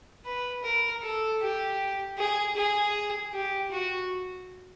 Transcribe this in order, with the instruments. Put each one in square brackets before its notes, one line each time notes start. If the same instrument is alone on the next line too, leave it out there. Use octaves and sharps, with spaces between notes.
[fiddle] B4
A#4
A4
G4
G#4
G#4
G4
F#4